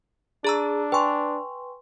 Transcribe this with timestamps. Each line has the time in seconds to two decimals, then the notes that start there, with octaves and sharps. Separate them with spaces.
0.44 D4 G#4 A#5 E6
0.92 B4 G5 G#5 C6 C#6